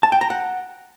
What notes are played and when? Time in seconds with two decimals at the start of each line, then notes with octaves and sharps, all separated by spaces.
0.03 A5
0.12 G5
0.21 A#5
0.30 F#5